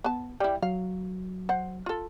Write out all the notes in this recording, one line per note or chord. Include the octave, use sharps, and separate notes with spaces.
B3 A5
G3 E4 D5 G5
F#3 F5
C5 F#5
F4 A4